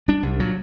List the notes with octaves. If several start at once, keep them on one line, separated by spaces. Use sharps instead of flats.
G3 D4
C2
A#2 F#3